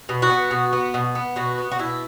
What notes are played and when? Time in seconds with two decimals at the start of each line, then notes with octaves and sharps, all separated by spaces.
0.09 B2
0.22 F#4
0.30 B3
0.51 B2
0.73 B3
0.94 B2
1.15 B3
1.36 B2 F#4
1.58 B3
1.71 F#4
1.79 B2 E4